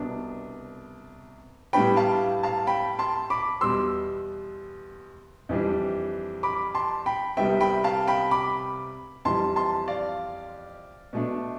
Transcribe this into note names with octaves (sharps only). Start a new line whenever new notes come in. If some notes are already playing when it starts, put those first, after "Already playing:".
Already playing: C2 B2 B3 D4
A2 G3 B3 D4 G5 B5
F5 A5
F5 A5
G5 B5
A5 C6
B5 D6
E2 B2 G3 B3 C6 E6
F2 E3 G3 D4
B5 D6
A5 C6
G5 B5
C2 C3 G3 B3 E5 G5
G5 B5
F5 A5
G5 B5
B5 D6
F2 E3 G3 A5 C6
A5 C6
D5 F5
B2 A3 D4